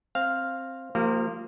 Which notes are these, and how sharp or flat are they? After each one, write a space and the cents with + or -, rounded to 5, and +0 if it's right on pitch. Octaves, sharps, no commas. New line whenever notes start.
C4 +10 F5 +0
F3 +0 A#3 -30 G4 -30